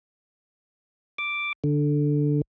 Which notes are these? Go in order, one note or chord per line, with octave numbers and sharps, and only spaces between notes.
D6
D3